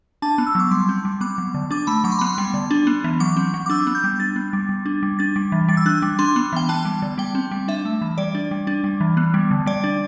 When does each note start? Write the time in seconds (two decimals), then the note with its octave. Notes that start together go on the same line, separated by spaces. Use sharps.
0.22 D4 A5
0.38 B3
0.47 E6
0.55 F#3 D6
0.71 G3 C6
0.89 C4
1.05 G3
1.21 B3 D6
1.38 F#3
1.54 D3
1.71 D4 D6
1.87 A3 B5
2.04 F#3 D6
2.12 C6
2.19 B3 B5
2.27 C6
2.38 G3
2.54 D3
2.71 D4
2.87 B3
3.04 E3
3.20 F#3 D6
3.37 C4
3.54 F#3
3.66 D6
3.70 D4 E6
3.87 B3
3.95 G6
4.04 G3
4.20 D4 A6
4.36 B3
4.53 G3
4.69 G3
4.86 D4
5.03 G3
5.19 D4 A6
5.36 G3
5.52 E3
5.68 G3 A6
5.77 E6
5.86 D4 F#6
6.02 G3
6.19 D4 C6
6.36 B3
6.53 E3 G5
6.69 B3 A5
6.85 G3
7.02 D3
7.18 G3 G5
7.35 C4
7.51 G3
7.68 D4 E5
7.85 A3
8.01 E3
8.18 G3 D5
8.35 D4
8.51 G3
8.67 D4
8.84 G3
9.00 E3
9.17 B3
9.34 G3
9.51 D3
9.66 G3 D5
9.84 D4